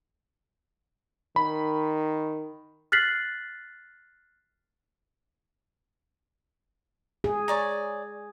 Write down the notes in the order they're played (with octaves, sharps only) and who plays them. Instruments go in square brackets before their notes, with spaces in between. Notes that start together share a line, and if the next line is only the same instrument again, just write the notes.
[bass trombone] D#3 [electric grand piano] B5
[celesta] F6 F#6 A6 B6 C7 F#7
[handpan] G#4
[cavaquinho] C#5 D5 A#5